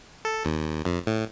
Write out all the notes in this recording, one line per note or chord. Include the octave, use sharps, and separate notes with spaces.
A4
D#2
F2
A2